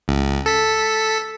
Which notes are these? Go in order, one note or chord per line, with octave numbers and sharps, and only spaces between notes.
C#2
A4 B6